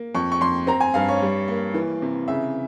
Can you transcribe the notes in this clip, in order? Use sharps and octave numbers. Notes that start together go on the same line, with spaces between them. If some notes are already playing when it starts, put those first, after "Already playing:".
Already playing: A#3
F2 C#6
C#6
F2 C6
C4 A#5
G#5
G2 F5
C#5
G3
A#3
E3
C3
C#3 E5